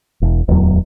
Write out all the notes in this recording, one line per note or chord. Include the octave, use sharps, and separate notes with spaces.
E1
D1 E2 F#3